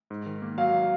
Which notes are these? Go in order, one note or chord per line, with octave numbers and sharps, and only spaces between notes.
G#2
D#3
A#3
F#3 F5